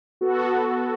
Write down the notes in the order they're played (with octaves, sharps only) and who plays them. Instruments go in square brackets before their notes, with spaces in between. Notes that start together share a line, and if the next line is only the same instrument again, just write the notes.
[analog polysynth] B3 F#4 A4
B3
B3